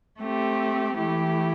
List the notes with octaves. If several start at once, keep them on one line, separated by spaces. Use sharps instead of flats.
A3 C4 G4
E3 A3 E4 G4